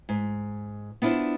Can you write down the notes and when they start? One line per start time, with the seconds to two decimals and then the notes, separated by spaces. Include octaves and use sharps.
0.09 G#2
1.02 B3 D4 E4 F4 C5